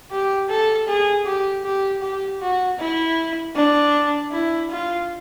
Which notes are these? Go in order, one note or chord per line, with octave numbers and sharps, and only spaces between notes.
G4
A4
G#4
G4
G4
G4
F#4
E4
D4
E4
F4